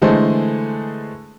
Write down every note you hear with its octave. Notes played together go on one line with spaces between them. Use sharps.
D3 E3 G#3 A3 G#4 C5